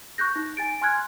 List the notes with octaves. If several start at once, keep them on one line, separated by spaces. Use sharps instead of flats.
C#6 F#6 G6 A#6
D#4
G#5 A6 D7
G#5 C6 F6 F#6 G#6